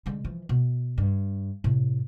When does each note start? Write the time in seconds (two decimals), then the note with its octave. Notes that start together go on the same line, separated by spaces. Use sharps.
0.06 D3 G#3
0.24 E3 F3
0.49 B2
0.98 G2
1.64 A2 C3